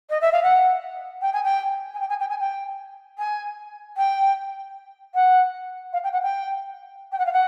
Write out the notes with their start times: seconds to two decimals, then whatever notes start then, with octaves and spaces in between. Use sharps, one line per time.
0.10 D#5
0.21 E5
0.32 F5
0.43 F#5
1.21 G5
1.33 G#5
1.43 G5
1.94 G#5
2.00 G5
2.09 G#5
2.20 G5
2.29 G#5
2.40 G5
3.18 G#5
3.97 G5
5.14 F#5
5.93 F5
6.03 G5
6.13 F#5
6.22 G5
7.12 G5
7.18 F#5
7.25 F5
7.32 F#5